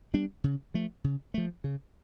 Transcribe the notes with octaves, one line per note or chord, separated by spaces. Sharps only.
G3 B3 D4
C#3
F3 A3
C#3
F3 A3
C#3